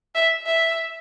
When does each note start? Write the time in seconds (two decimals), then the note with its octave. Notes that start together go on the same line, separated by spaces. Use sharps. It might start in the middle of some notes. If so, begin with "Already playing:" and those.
0.15 E5
0.46 E5